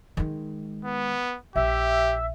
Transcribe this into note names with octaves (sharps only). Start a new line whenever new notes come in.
D#3 G#3
B3
A#1 G4 E5